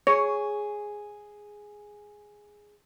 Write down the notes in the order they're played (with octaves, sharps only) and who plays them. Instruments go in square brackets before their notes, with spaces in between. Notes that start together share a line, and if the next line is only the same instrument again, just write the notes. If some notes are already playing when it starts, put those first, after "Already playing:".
[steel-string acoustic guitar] G#4 [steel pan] C#5